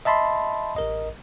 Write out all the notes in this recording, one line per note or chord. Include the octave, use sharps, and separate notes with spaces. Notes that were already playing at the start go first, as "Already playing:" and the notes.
D#5 E5 A5 B5 C6
A1 A#4 D#5